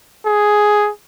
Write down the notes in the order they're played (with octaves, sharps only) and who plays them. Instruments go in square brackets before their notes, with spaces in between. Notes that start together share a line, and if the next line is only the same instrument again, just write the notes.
[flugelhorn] G#4